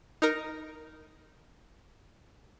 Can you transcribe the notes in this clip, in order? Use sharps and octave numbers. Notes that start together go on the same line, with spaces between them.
D#4 A#4